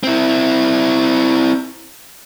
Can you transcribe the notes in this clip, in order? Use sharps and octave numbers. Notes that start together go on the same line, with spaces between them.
C4 E4